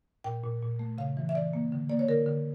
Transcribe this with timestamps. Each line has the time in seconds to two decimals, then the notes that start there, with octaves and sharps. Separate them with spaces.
0.24 A#2 G5
0.44 A#2
0.62 A#2
0.79 A3
0.98 C#3 F5
1.17 E3
1.29 E5
1.35 E3 D5
1.53 A#3
1.72 D3
1.90 A#3 D5
1.99 C#5
2.09 D3 A#4
2.26 D3